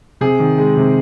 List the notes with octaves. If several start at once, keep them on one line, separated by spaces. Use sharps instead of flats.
C3 G#4
D#3
G#3
C3